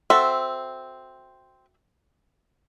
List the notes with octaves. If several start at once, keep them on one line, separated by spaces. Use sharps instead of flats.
C4 F#4 A4 E5